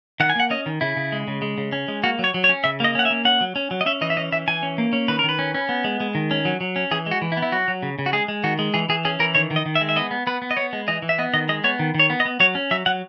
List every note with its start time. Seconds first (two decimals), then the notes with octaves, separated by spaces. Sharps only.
0.20 D#3 F#5
0.30 G#5
0.36 A#3 F#5
0.50 C#4 D#5
0.66 D#3
0.81 C#3 E4
0.97 C#3
1.12 G#3
1.28 C#3
1.42 G#3
1.58 C#3
1.72 C#4
1.88 G#3
2.04 A#3 F#4
2.19 F#3 C#5
2.34 F#3
2.44 C#5
2.49 C#4
2.64 C#3 E5
2.80 A#3 D#5
2.95 C#4 F#5
3.05 E5
3.11 A#3
3.25 C#4 F#5
3.41 F#3
3.56 C#4
3.71 F#3
3.81 D#5
3.86 C#4 E5
4.01 E3 D#5
4.10 E5
4.17 C#4 D#5
4.32 E3 E5
4.48 E3 G#5
4.63 C#4
4.78 A#3
4.93 C#4
5.08 D#3 B4
5.19 A#4
5.24 D#3
5.29 B4
5.39 C#4
5.54 C#4
5.69 B3
5.84 G#3
6.00 G#3
6.15 D#3
6.31 C#4
6.45 F#3
6.61 F#3
6.76 C#4
6.91 E3 G#4
7.06 G#3
7.11 F#4
7.22 E3
7.32 E4
7.37 B3
7.42 E4
7.52 F#3 F#4
7.68 F#3
7.83 C#3
7.99 C#3
8.06 F#4
8.13 G#3 G#4
8.28 G#3
8.44 D#3 F#4
8.59 G#3
8.74 E3 G#4
8.89 E3 G#4
9.05 C#4 G#4
9.19 E3 A#4
9.35 D#3 C#5
9.51 D#3
9.56 D#5
9.66 D#3
9.75 E5
9.81 G#3
9.89 E5
9.96 B3 D#5
10.11 B3
10.27 B3 B4
10.42 B3
10.51 D#5
10.57 B3 C#5
10.73 G#3
10.88 E3 D#5
11.02 E3
11.09 E5
11.19 B3 D#5
11.34 D#3 D#5
11.49 G#3 D#5
11.64 B3 C#5
11.79 D#3
11.95 D#3 C#5
12.10 B3
12.20 D#5
12.25 B3
12.40 F#3 C#5
12.55 C#4
12.71 F#3 E5
12.86 F#3 F#5